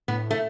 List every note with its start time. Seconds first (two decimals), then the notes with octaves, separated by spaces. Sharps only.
0.08 A2 B3
0.31 A3